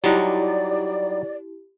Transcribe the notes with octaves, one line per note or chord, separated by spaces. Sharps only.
F#3 G3 D#4 E4 G4 D5